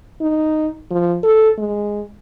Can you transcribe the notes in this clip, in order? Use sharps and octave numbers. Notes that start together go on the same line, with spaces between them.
D#4
F3
A4
G#3